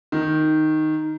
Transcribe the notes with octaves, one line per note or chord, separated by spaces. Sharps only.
D#3